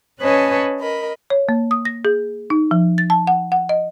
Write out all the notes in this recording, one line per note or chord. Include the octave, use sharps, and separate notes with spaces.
C#4 B4 C#5 D#5 G#5 A5
A#4 D#5 B5
C#5
A#3
D#6
A#6
G#4
D#4
F3
A6
A5
F#5
F#5
D#5